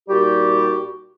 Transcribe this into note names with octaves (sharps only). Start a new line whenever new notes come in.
A#2 G3 D#4 F#4 G4